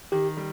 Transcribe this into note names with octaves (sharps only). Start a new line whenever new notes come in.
D#3 G4
G3